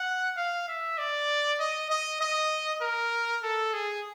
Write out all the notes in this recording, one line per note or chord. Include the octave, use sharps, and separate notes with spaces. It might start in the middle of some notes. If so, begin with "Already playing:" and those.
Already playing: F#5
F5
E5
D5
D#5
D#5
D#5
A#4
A4
G#4